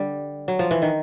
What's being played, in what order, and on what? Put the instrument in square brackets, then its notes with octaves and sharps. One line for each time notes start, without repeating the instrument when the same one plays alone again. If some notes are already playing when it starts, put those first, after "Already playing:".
Already playing: [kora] D3 G3
F#3
F3
E3
D#3